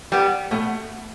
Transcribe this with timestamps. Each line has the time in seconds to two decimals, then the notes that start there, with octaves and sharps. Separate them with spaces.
0.12 G3 B3
0.51 B2 A3